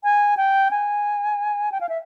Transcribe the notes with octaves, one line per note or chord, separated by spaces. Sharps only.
G#5
G5
G#5
G5
F5
E5